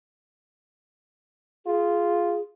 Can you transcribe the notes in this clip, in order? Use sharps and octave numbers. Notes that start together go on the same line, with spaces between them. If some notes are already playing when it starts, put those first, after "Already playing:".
F4 G#4